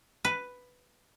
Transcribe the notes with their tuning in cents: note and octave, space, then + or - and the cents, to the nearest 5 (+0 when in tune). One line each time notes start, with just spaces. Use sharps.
B4 +5